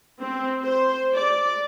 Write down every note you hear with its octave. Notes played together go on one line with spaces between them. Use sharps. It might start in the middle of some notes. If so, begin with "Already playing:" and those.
C4
C5
D5